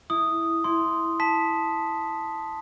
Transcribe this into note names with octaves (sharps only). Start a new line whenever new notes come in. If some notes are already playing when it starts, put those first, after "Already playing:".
E4 D#6
E4 C6
A5 B6